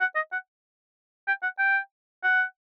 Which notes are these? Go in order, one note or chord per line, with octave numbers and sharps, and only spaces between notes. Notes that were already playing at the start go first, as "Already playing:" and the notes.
F#5
D#5
F#5
G5
F#5
G5
F#5